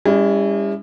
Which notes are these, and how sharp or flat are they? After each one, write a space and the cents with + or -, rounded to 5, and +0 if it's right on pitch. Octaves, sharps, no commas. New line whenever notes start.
G3 +45 C#4 +30 E4 +0